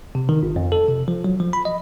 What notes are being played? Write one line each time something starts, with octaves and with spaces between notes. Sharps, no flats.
C3
D#3
G1
F2
A4
C3
F3
F#3
F3
B5
D#5